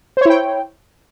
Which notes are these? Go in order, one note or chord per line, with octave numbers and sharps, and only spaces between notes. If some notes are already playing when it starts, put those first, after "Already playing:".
E4 C5 C#5 G5